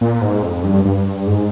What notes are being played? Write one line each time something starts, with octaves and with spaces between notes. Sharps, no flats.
A#2
G#2
F2
G2
G2
G#2